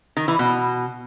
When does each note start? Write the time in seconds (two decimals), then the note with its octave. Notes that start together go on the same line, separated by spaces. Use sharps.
0.17 D#3
0.28 E3
0.39 B2